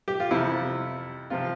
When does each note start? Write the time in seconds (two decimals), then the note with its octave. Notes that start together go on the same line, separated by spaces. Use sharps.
0.08 G4
0.20 F4
0.31 F2 C3 F3 E4
1.30 C3 F3 F4